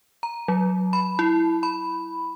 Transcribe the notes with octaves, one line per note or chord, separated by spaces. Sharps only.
A#5
F#3
B5
E4
B5